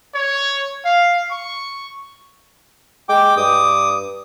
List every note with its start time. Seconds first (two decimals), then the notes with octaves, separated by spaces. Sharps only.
0.15 C#5
0.85 F5
1.31 C#6
3.09 G#3 G5 D6
3.37 G2 D6 D#6